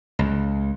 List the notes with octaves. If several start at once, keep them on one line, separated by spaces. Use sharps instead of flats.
C#2